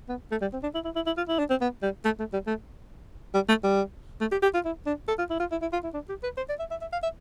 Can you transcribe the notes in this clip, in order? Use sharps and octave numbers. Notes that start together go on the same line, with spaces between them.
B3
A3
G3
C4
D4
E4
E4
E4
E4
F4
E4
D4
C4
B3
G3
A3
A3
G3
A3
G3
A3
G3
A3
G4
G4
F4
E4
D4
A4
F4
E4
F4
E4
E4
F4
E4
D4
G4
B4
C5
D5
E5
E5
E5
F5
E5